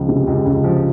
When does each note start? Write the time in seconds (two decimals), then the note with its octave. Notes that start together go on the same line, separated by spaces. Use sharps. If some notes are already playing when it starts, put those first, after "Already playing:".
Already playing: C#2 F3
0.09 C3
0.27 C#2
0.46 C#2
0.64 F3